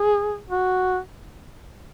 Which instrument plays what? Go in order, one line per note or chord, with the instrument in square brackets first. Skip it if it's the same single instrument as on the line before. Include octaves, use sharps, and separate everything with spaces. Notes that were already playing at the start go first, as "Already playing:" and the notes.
Already playing: [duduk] G#4
F#4